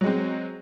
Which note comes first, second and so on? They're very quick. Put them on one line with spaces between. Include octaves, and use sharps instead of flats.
F#3 G#3 C4